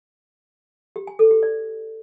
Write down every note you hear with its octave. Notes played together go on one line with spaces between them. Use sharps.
G4
G#5
A4
G4
D5